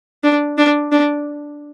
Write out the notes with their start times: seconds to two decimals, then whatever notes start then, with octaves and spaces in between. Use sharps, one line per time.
0.24 D4
0.58 D4
0.92 D4